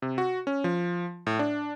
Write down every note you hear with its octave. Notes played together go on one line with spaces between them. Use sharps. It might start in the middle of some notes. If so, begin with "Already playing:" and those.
C3
F#4
C#4
F3
A2
D4